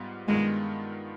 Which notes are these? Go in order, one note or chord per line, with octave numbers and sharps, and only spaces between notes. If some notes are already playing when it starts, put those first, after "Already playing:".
Already playing: G#2 G3 B3 F4
G2 D#3 G#3 B3 F4